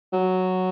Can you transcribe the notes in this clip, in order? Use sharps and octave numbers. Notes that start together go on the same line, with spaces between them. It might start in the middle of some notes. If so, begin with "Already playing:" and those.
F#3